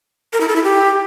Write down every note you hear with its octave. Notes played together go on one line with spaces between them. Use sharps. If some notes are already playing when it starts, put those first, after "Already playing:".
A#4
E4
A4
E4
G4